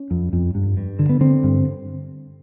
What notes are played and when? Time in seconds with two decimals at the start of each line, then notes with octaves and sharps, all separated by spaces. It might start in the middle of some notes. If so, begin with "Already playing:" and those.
Already playing: C#4
0.11 F2
0.33 F2
0.55 G2
0.77 G2
0.99 D3
1.09 B3
1.21 D3 C4
1.43 G2